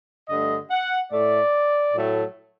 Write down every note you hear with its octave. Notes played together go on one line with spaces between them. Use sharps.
G2 D3 A3 D#5
F#5
A2 A3 D5
A2 F#3 A3